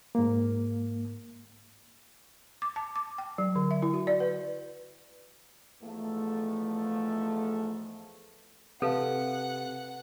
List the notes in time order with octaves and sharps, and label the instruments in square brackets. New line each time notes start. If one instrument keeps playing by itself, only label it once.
[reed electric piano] G#2 A#3
[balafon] D6
A5
D6
G5
F#3
D3
E5
E4
F#4
D5
B4
[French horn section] E2 G#2 F3 A3
[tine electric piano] C3 [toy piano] A4 [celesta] B4 F5 A5 [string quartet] F#5